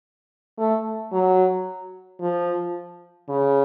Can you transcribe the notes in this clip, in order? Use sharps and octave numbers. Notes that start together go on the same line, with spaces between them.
A3
F#3
F3
C#3